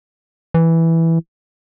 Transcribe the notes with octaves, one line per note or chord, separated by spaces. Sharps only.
E3